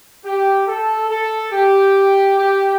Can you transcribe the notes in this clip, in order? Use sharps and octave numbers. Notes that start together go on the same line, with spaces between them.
G4
A4
A4
G4
G4